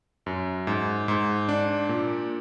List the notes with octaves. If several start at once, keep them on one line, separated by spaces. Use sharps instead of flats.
F#2
G#2
G#2
D4
A#2